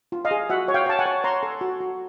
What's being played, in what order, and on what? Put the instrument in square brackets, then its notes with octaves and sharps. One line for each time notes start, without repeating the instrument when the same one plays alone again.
[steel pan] F4
D#5 F5
G#4
F#4 E5 F#5
C#5
F5 G5
C#5 A5
F#5 G#5
C#5
C#5 A#5 C6
A4
F#4
F#4